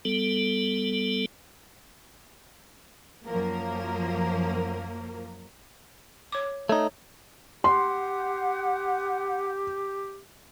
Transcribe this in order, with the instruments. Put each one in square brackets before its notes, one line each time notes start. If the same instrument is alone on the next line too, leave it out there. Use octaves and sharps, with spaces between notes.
[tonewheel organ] G3 B3 A4
[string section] F#2 F3 A#3 A#4
[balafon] C#5 D6
[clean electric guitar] A3 D#4 [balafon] C#5
[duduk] G4 [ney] F#5 [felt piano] C6